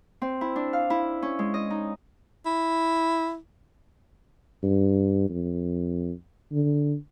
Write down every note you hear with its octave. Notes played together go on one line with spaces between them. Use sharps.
C4
E4
D4
F5
E4
C#4
G#3
D#5
D#4
E4
G2
F2
D3